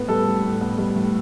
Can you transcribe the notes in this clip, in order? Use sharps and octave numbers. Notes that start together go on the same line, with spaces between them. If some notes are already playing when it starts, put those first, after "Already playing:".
Already playing: A2 B3 B4
G3 A4
A2
A2
B3
G3
A2